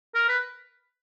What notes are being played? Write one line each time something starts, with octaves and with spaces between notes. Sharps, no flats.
A#4
B4